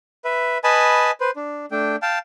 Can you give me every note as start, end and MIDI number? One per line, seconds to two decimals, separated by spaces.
0.25 0.58 71
0.25 0.58 76
0.64 1.11 71
0.64 1.11 75
0.64 1.11 80
0.64 1.11 81
0.64 1.11 83
1.20 1.31 71
1.20 1.31 72
1.36 1.66 62
1.71 1.96 57
1.71 1.96 62
1.71 1.96 79
2.02 2.19 77
2.02 2.19 79
2.02 2.19 81